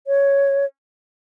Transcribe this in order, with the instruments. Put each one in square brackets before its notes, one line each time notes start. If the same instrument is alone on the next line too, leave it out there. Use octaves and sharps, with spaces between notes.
[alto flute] C#5